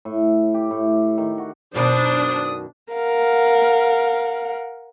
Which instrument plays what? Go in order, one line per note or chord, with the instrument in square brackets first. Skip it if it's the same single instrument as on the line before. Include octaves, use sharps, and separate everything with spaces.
[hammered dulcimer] A2
G4
A2
D#3
F#4
[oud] F#2 B2 D#3 [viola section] D4 [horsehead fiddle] C5 [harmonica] D5 D#6
[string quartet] A#4 F5 F#5